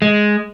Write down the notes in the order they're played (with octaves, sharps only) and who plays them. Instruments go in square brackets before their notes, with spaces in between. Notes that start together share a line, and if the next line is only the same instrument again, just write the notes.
[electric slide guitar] G#3